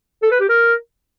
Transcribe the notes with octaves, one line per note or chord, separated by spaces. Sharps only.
A4
B4
G4
A#4